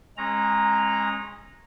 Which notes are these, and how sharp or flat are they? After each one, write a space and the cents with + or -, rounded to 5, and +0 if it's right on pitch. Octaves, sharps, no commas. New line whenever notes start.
G#3 +0 C#4 -35 A#5 +0